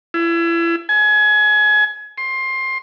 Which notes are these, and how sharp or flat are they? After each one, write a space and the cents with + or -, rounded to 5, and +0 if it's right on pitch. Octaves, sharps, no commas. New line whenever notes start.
E4 +35
G#5 +30
C6 +20